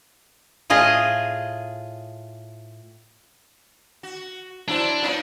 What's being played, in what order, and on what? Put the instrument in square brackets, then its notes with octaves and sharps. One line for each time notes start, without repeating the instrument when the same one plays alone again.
[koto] A2 F4 G#4 D#5 G#5
[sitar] F#4
[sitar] F#3 E4 C5 [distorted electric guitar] D4
[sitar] B3 D#4 F4